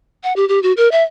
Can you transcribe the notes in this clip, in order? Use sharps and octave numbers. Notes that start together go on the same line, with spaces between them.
F#5
G4
G4
F#4
A#4
E5